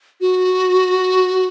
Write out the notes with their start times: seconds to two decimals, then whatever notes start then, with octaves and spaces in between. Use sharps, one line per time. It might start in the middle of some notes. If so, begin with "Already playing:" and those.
0.21 F#4